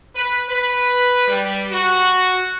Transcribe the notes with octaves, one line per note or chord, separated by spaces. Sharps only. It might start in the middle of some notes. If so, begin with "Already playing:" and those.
B4
B4
G3
F#4